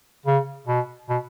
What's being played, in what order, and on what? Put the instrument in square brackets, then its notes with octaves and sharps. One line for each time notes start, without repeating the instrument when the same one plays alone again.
[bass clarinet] C#3
B2
B2